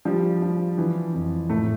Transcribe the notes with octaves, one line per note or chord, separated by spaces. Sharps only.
F3 G3
F3
E3
F2
A2 A3